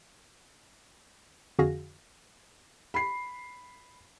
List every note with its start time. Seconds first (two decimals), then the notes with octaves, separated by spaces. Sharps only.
1.59 F2 D3 F#4 G#4 F5 A#6
2.94 B5 C7